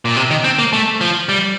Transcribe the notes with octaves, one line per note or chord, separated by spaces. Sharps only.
A#2
C3
D#3
C4
A#3
A3
F3
G3